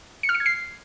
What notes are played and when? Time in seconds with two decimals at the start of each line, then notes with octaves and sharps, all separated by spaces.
0.23 C#7
0.29 F6
0.35 C#7
0.40 G#6
0.46 C7